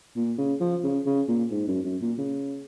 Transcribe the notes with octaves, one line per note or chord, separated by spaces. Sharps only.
A#2
C#3
F3
C#3
C#3
A#2
G#2
F#2
F#2
A#2
C#3